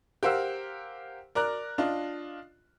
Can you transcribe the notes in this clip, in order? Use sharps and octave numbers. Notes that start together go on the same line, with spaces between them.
G4 A#4 C5 F5 F#5 E6
A#4 D5 A#5 F#6
D4 F4 D#5